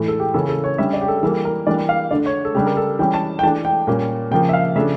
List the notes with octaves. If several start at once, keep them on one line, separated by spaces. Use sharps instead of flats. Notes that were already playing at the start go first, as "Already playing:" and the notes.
Already playing: A2 E3 A3
A4
G4
C#3 E3 A#3 C#4 A4
A4
C#5
D3 G3 C#4 E5
D5
G4
A4
E3 G3 A#3 A4
A#4
E3 G3 A#3 D4 D5
F5
D3 A3 D4 D5
C#5
A4
C#3 G3 D4 G4
A#4
A4
E3 G3 C#4 G5
A5
G5
E3 A3 D4 A5
G5
A#2 G3 A#3 C#4
C#3 F3 A#3 G5
E5
F5
C#3 F3 A3 D4 E5